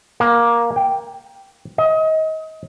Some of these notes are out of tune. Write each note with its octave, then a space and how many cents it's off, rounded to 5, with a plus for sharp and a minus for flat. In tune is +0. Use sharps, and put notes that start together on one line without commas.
A#3 +10
G5 +0
D#5 +30